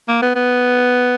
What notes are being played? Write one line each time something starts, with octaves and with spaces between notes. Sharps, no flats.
A#3
B3
B3